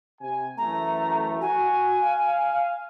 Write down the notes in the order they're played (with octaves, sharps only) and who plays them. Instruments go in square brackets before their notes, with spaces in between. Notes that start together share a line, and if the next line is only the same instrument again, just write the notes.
[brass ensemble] C3 G#5
[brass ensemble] F#2 E3 A3 [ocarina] A#5
[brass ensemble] F#4 [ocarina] G#5
[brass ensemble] F5